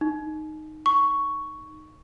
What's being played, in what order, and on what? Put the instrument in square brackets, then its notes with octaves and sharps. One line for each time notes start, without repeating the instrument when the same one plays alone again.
[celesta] D#4
[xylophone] C#6